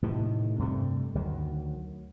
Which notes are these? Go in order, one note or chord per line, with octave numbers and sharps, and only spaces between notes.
A2 C3 D#3
G2 C3 G3 A3
D2 D#3 F#3